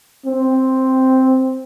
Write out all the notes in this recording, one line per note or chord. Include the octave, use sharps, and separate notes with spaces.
C4